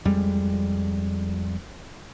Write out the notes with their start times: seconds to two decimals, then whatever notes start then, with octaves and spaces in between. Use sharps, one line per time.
0.05 F2 G3 G#3